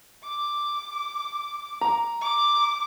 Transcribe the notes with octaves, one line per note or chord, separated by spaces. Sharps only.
D6
A#5
D6